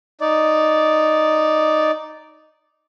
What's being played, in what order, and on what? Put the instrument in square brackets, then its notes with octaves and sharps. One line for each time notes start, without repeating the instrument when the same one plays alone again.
[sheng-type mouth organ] D#4 D5